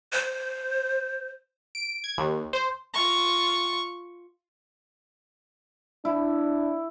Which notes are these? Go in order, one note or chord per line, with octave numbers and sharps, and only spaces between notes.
C5
D7
G#6
D#2
C5
F4 C#6
D4 E4